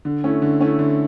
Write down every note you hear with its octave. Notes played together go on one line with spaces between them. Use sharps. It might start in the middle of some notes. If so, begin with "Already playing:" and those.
D3
A3 C#4 E4
D3
A3 C#4 E4
D3